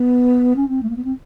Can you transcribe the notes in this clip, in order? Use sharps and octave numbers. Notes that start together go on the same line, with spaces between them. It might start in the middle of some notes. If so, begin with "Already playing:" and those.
Already playing: B3
C#4
C4
A3
A#3
B3
C4